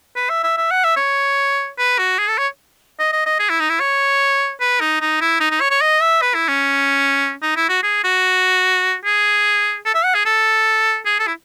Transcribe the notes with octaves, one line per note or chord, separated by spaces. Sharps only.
B4
E5
E5
E5
F#5
E5
C#5
B4
F#4
G#4
A4
C#5
D#5
D#5
D#5
G#4
E4
D#4
E4
C#5
B4
D#4
D#4
E4
D#4
D#4
C#5
C#5
D#5
E5
B4
E4
C#4
D#4
E4
F#4
G#4
F#4
G#4
A4
E5
F#5
G#4
A4
G#4
A4
E4